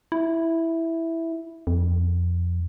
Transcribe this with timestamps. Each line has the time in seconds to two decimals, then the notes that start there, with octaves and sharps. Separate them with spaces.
0.12 E4
1.67 F2